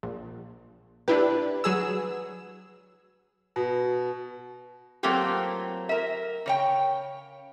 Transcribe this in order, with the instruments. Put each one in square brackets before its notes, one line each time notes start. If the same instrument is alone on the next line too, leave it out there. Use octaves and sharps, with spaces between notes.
[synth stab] A#1
[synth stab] D4 E4 G4 [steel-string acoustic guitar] B4
[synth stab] F#3 G#4 E6
[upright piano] B2
[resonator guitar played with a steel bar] F#3 A3 A#3 C4 F4 G4
A#4 E5
C#3 C#5 G5